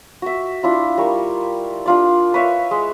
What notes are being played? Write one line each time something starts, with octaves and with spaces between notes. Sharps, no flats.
F#4 E5
D4 E4 F4
G3 A#4 C#6
D4 F4 D5
B4 C#5 E5 F5
G#3